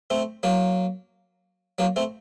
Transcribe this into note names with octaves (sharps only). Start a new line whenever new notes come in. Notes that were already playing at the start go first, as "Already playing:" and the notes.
A3 C4
F#3 A#3
F#3 A#3
A3 C4